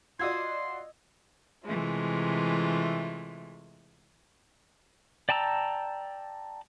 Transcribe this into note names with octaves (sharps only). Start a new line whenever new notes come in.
F4 F#4 D5 D#5 C6 E6 G#6
C3 E3 G#3 A3 F4
D5 G5 A5 A#5 E6